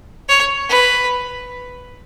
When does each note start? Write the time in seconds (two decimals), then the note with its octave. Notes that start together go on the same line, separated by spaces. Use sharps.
0.29 C#5
0.69 B4